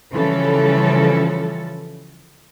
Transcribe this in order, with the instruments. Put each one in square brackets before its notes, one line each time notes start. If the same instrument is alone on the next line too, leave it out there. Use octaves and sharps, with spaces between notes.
[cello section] C#3 E3 F3 G3 C#4 A4